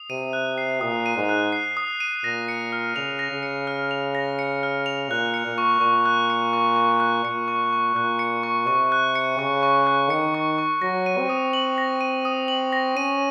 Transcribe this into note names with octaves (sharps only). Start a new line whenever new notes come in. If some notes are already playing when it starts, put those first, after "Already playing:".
Already playing: D#6
C3 D#7
F#6
C7
A#2 D#6
D#7
G#2
F#6
C7
D#6
D#7
A#2 A#6
C#7
F6
C#3 F7
A#6
C#3
C#7
F6
F7
A#6
C#7
F6
F7
A#2 F#6
C#7
A#2
C#6
A#2 C#6
F#6
C#7
C#6
C#6
F#6
A#2 C#7
C#6
C#6
A#2 F#6
C#7
C#6
C3 C#6
F#6
C#7
C#3 C#6
C#6
F#6
D#3 C#7
C#6
C#6
F#3 A#6
D#7
C4
D#6
F#7
A#6
D#7
D#6
F#7
A#6
C#4 D#7